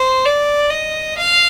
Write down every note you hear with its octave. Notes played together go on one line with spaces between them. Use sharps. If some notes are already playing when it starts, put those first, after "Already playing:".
Already playing: C5
D5
D#5
F5